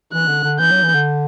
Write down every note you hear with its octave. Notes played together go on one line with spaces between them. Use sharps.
E3 F#6
D3
D3
E3 G6
F#3
E3
D3